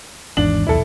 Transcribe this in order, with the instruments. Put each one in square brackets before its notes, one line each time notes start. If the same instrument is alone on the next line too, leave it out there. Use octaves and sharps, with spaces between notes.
[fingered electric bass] G#1 E2 G#2 [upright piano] D4 F#7
[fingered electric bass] D#1 B1 E2 [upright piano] E4 A4